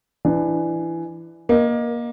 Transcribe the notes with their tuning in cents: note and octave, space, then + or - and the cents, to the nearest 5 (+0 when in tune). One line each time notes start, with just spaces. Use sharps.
E3 +15 D4 +25
A#3 +20 D#5 -10